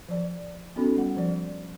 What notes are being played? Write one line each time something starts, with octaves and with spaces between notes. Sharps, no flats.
F3 D5
B3 C#4 D#4 F#4 A4 B5
G3 F#5
F3 D5